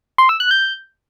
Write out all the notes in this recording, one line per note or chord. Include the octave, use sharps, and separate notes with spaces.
C6
E6
F#6
G6